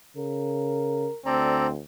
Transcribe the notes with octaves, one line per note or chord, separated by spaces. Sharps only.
C#3 A#4
D2 C4 A4 D5 A#5